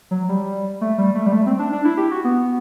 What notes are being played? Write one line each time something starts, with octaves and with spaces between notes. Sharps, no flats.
F#3
G3
A3
G3
A3
G3
A3
C4
D4
D4
E4
G4
F#4
B3